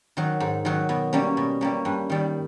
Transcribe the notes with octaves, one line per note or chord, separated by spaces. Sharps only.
D#3 F#3
G#2
D#3 F#3
B2
G3 A#3 C#4
B2
G3 A#3 C#4
G2
D#3 G3